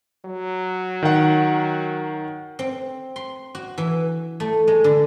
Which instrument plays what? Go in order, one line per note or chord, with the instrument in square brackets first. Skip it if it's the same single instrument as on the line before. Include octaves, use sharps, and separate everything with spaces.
[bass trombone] F#3
[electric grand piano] D#3 F#5
[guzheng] C4
C6
F#4
E3
A3
G#3
D3